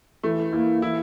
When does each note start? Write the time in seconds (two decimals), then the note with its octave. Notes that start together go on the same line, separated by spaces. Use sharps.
0.23 E3 A3
0.53 A#3 E4
0.82 E3 E4